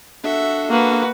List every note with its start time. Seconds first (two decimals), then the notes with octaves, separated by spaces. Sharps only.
0.24 D4 F#4 A4 E5
0.70 A#3 F#4 B4